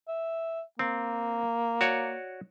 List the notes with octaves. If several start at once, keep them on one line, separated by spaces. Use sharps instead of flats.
E5
A#3 C4
F#4 C#5 D5